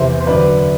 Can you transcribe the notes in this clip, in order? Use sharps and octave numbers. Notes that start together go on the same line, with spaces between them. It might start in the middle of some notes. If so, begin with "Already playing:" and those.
Already playing: E2 C3 E3 C5 E5
C5
F#2 D3 B4 D5